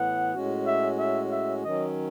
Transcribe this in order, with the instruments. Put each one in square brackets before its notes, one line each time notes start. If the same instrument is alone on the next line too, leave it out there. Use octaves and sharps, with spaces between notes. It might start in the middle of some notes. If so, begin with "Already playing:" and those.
Already playing: [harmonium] A2 E3 B3 [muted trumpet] F#5
[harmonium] A2 G#3 C#4 F#4
[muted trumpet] E5
E5
E5
[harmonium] D#3 F#3 C#4 [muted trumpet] D#5